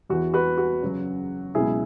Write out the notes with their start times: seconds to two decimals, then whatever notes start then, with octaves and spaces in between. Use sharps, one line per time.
0.10 E2 E3 F#4
0.34 F#4 B4
0.58 F#4
0.83 F#2 C#3 F#3
1.55 C#2 B2 F#3 E4 G#4